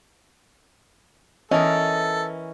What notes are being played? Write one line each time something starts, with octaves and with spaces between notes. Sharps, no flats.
E3 C#4 A4 A#4 D#5